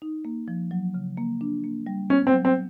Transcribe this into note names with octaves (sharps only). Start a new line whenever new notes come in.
D#4
A#3
F3
F#3
C#3
A#3
D4
A#3
G3
B3 C#4
C4
F#3
C4